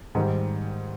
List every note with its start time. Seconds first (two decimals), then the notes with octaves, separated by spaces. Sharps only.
0.15 G#2 D#3 G3